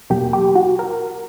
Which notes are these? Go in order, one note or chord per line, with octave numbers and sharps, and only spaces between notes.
E2 B2 F#3 A#3 G4
G4
F#4
A#4